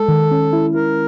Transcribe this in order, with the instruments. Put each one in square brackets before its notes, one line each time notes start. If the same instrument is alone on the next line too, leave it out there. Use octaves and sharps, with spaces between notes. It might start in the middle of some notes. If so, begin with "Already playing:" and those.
Already playing: [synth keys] G#3 [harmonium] A4
[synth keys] D#3
C#4
E4
[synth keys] E4 [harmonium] A#4